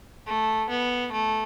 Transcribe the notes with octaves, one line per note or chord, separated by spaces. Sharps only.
A3
B3
A3